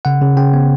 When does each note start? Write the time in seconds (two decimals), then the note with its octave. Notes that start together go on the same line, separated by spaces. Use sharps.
0.05 C#3 F#5
0.22 C#3
0.37 C#3 G5
0.53 B3